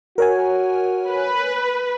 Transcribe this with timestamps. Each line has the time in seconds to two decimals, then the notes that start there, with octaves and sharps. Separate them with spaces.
0.18 F#4 A#4 C#5 G#5
1.08 B4